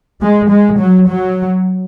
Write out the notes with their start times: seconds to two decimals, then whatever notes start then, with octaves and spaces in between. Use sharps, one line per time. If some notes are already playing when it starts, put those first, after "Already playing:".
0.22 G#3
0.50 G#3
0.79 F#3
1.07 F#3